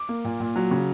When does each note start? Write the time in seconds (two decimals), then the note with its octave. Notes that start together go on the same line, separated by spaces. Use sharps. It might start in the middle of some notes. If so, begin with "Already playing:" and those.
Already playing: D6
0.09 A#3
0.25 A#2
0.40 A#2
0.56 F#3
0.71 C#3